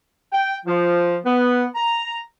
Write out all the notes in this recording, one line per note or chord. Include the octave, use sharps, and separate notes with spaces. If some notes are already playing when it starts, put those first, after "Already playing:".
G5
F3
B3
A#5